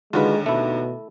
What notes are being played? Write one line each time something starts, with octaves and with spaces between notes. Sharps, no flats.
D#2 D3 G#3 F4 F#4 B4
B2 A3 E4